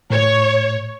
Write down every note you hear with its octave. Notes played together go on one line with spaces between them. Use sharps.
A2 C#5